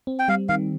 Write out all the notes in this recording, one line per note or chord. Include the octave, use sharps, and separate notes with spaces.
C4
G5
G3 F5
D#3 F5